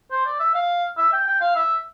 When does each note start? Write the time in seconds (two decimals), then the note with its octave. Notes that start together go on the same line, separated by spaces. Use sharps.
0.11 C5
0.26 D5
0.40 E5
0.55 F5
0.98 E5
1.13 G5
1.27 G5
1.41 F5
1.56 E5